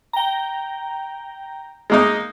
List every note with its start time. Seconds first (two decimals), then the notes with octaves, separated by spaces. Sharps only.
0.13 G5 A#5
1.90 G#3 A#3 D#4